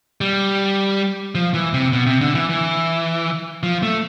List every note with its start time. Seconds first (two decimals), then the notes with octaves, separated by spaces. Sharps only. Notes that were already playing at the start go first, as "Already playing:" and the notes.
0.21 G3
1.35 F3
1.54 E3
1.73 C3
1.93 B2
2.06 C3
2.21 D3
2.35 E3
2.49 E3
3.63 F3
3.83 A3